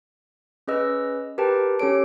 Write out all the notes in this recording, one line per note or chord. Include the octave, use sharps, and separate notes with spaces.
C#4 G#4 B4 D#5 E6
G4 A#4 B4 G5 A5
C#4 G4 A4 C#5 D7